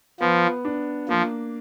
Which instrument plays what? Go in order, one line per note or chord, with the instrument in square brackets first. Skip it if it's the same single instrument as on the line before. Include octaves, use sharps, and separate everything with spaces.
[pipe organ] F3 [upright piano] B3
[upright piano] D4
[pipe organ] F3 [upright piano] A#3